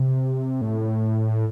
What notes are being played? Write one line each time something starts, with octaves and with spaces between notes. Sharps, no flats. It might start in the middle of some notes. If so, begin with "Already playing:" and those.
Already playing: C3
A2